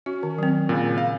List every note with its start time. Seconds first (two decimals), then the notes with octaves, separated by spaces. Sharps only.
0.06 C#4 F#4
0.23 D#3
0.38 F#3 C4
0.69 A#2 C#3
0.98 F5